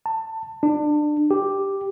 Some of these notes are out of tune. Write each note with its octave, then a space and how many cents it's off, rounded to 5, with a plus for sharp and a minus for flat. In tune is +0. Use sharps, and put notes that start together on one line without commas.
A5 +20
D4 +25
G4 +0